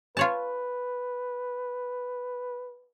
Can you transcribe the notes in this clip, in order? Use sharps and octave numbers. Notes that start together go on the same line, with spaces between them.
F4 B4 C#5 A5